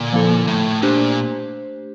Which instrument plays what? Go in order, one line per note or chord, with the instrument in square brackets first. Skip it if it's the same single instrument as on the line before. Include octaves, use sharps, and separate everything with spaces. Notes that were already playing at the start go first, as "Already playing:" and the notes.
Already playing: [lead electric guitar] A#2 [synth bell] D3
[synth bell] F3 A#3 E4 A4
[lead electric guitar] A2 [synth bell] A3
[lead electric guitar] A#2 [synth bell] D4 G4 C5